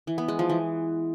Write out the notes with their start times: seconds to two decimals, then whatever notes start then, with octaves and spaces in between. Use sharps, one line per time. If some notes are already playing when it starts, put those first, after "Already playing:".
0.07 E3
0.18 B3
0.28 G#3
0.39 F3
0.49 E3